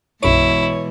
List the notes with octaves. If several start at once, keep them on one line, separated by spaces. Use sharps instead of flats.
B1 F#2 B2 E3 G#3 E4 C#5 D7